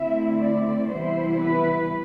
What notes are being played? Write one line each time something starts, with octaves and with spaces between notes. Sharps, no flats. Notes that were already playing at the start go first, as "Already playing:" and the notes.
Already playing: D3 A3 C4 E4 E5
D5
C3 E3 G3 B3 E4 C5
B4